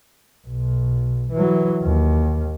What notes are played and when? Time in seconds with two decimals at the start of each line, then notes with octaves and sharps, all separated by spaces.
0.48 B1
1.32 E3 F#3
1.83 D#2